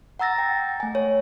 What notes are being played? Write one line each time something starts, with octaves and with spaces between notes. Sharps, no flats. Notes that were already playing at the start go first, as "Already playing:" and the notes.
F#5 A#5 E6 A6 A#6
G5
A3 G#5
C#5